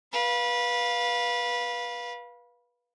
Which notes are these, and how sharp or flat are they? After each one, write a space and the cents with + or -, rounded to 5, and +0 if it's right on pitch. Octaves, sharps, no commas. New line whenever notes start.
B4 -20 F5 +10